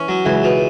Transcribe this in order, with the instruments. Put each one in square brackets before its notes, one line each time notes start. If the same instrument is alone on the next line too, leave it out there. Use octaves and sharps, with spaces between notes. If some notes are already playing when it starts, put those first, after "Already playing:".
Already playing: [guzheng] E3 [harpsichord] C#4
[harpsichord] F#3
[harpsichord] C#2 [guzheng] E3
[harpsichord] B2